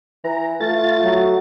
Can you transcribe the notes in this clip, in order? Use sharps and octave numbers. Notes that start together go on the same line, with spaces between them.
E3 A#5
A3 F4 A6
F#3